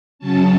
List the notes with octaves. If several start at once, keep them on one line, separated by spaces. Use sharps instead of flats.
C#3 F#3 C#4 A5